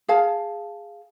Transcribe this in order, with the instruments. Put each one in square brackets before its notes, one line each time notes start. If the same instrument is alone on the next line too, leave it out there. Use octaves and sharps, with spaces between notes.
[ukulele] G#4 F5 A5